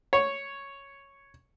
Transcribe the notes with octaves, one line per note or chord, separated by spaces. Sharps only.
C#5